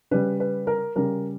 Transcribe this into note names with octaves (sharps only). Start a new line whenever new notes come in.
C#3 G3 B4
B4
A#4
C#3 G3 A#4